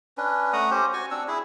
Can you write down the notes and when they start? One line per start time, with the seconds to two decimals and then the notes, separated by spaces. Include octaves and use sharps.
0.17 C#4 D4 B4
0.53 A3 F#5 A#5 D#6
0.71 C#4 G4 C5
0.93 F#4 G#5 C#6
1.11 C4 D4 E6
1.28 E4 G#4